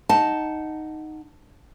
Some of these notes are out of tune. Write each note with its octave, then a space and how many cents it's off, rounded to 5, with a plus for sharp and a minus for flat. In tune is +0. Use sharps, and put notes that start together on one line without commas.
D#4 +0 F#5 +0 A5 -5